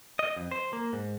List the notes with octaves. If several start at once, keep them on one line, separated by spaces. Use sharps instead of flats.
D#5
F2
C5
A#3
G#2